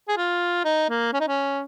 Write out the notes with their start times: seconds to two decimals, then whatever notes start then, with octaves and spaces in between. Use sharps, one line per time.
0.08 G#4
0.17 F4
0.64 D#4
0.89 A#3
1.13 C#4
1.20 D#4
1.28 C#4